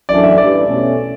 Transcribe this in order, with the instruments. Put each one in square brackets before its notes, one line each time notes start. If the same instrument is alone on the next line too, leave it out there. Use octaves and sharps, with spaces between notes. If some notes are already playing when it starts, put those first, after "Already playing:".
[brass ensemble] F#2 E3 A3 D4 [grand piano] D5
[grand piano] E5
[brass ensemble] A1 G2 E3 [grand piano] D5
[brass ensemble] B2 A3 C#4